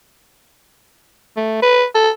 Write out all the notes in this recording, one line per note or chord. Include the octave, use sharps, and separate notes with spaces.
A3
B4
A4